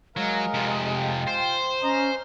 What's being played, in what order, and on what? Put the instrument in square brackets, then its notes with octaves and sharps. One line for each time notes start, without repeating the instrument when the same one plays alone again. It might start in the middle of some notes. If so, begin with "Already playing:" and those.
[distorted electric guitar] F#3 [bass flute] G#3 [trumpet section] A#4 F5
[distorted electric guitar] F2 C3
[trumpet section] F4 G5
[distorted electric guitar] C5
[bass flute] C#4 [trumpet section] D#5 A#5